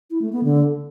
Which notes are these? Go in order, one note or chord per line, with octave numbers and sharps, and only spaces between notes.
E4
A3
B3
D3